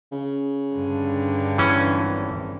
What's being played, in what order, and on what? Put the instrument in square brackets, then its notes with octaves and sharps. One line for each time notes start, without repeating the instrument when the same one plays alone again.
[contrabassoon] C#3
[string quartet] G2 D3
[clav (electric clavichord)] E3 C#4
[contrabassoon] G#1